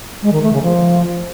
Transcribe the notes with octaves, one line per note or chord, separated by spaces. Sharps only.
G#3
D#3
A3
C#3
F3